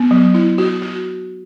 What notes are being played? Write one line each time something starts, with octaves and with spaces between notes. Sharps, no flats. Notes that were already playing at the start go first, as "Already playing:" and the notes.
Already playing: B3
F#3
E4
F#4
F#4